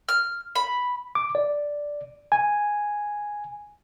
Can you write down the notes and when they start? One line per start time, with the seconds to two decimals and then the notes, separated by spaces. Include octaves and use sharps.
0.09 F6
0.56 B5
1.15 D6
1.35 D5
2.32 G#5